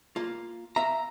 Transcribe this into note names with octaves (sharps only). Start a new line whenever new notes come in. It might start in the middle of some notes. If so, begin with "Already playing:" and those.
A#3 F4
E5 F5 A#5